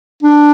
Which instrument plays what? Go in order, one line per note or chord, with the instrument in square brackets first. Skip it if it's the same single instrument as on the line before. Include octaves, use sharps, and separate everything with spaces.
[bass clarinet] D4